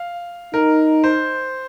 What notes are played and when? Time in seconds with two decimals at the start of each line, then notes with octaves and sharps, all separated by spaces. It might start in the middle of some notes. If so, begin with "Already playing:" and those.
Already playing: F5
0.53 D#4 A#4
1.04 C5